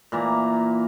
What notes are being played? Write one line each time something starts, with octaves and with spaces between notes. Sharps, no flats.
A#2 E3 A#3 A#5